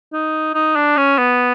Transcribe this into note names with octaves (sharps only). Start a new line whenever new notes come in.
D#4
D#4
D4
C#4
B3